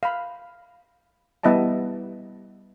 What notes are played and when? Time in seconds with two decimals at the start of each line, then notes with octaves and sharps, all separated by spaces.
0.03 F5 B5
1.43 G3 B3 E4 D#5 E5 A5